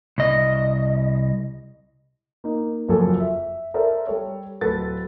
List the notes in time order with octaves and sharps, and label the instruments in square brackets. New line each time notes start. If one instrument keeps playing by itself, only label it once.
[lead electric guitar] C2 D#5
[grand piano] A#3 D#4
F#1 F2 F#3 F4 A4 G#5
E5
A4 A#4 C5 D5 E5
G3 A4 C#5
D1 A4 B4 A6